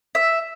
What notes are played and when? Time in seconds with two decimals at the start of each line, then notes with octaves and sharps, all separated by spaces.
0.15 E5